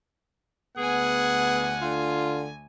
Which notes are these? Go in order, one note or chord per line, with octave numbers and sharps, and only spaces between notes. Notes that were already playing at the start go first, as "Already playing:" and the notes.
D2 B3 G#4 F#5 G#5
D3 F4